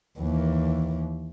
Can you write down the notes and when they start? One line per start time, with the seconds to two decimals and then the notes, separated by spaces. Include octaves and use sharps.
0.18 D#2 E3